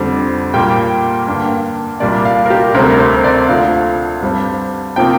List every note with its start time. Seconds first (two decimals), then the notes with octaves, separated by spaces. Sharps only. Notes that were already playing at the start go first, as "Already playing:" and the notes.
Already playing: F2 D3 G3 C4
0.54 A#2 G3 A#3 G5
1.27 G2 D3 A#3
2.00 C2 A#2 G3 A#3 D5
2.25 F5
2.46 A#4
2.50 G4
2.74 D2 C3 G3 C4 A#4
2.99 C5
3.24 D5
3.49 D2 D3 F3 F5
4.22 G2 G3 C4
4.96 C3 F3 A#3 G5